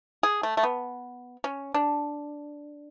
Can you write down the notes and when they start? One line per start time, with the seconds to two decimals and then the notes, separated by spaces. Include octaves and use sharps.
0.23 G#4
0.43 A3
0.57 A3
0.63 B3
1.44 C#4
1.74 D4